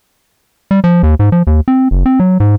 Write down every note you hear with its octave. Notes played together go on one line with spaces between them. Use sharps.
G3
F3
D#2
G#2
F3
D#2
C4
F#1
C4
F#3
G#2